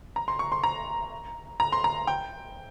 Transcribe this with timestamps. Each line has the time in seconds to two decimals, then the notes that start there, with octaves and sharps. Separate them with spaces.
0.16 A#5
0.28 C6
0.39 C#6
0.52 C6
0.64 A#5
1.60 A#5
1.72 C6
1.84 A#5
2.07 G5